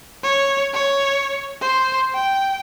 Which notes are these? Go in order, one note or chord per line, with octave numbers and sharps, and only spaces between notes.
C#5
C#5
C5
G5